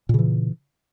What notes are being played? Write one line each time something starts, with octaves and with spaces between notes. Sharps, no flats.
A#2 C#3 E3